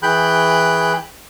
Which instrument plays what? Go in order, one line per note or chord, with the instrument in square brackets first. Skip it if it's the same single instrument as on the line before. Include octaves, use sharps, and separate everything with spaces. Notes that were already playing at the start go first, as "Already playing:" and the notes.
[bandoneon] E3 G#4 G5 B5 F#6 G6